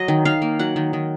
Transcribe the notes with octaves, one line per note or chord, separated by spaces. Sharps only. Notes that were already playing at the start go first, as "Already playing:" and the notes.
Already playing: F#3 D#5
D#3
D#3 F5
A#3
F#3 F#5
D#3
D#3